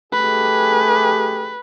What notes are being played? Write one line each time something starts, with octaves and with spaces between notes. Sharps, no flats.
A3 G4 G#4 B4